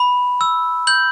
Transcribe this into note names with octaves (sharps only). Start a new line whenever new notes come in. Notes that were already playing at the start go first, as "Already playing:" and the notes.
Already playing: B5
E6
G6 F#7